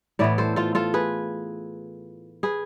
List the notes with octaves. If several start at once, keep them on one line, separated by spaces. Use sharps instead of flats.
A2 E3 B3 B4 D5
A4 C5
F4 A4
F4 A4
G#4 B4
G#4 B4